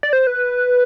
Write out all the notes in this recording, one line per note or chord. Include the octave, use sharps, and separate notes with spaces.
D5
C5
B4